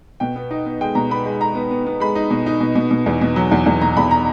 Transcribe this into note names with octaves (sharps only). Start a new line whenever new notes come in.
B2 G5
B3
D#4
B3
G#3 G5
B2 A#5
B3 B5
G#3
G#3 A#5
B3
B3
B3
G#3 B5
D#4
B2
D#4
B2
B2
B2
E2
B2
F#3
E2
E2
B2 A#5
E2 B5
A#5